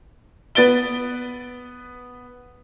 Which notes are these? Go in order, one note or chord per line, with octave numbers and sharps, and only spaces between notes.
B3 B4 A6 D7 G7